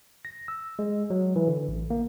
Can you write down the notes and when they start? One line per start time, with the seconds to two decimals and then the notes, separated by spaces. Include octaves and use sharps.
0.25 A#6
0.48 E6
0.79 G#3
1.10 F#3
1.36 E3
1.48 D3
1.68 A1
1.90 A#3